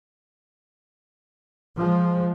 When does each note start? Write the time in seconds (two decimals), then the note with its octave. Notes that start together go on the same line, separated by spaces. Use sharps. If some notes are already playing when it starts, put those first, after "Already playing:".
1.77 F3 G#3